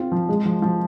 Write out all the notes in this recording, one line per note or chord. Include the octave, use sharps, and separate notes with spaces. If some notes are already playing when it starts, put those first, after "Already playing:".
Already playing: C4 F4
F3
G#3
F3
F3